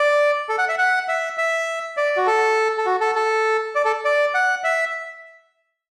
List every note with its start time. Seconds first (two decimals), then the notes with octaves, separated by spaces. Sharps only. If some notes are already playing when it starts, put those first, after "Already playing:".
Already playing: D5
0.49 A4
0.58 F#5
0.69 E5
0.78 F#5
1.08 E5
1.38 E5
1.97 D5
2.17 F#4
2.27 A4
2.78 A4
2.86 F#4
3.01 A4
3.15 A4
3.75 D5
3.85 A4
4.05 D5
4.34 F#5
4.64 E5